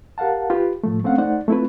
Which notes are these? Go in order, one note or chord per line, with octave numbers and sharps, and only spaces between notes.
G4 A#4 F5 F#5 A5
F4 G4 B4
A2 F3 A3
A3 C4 C#4 F5 F#5
A3 D#4 C5 D5 F#5
A3 C4 E4 F4 B4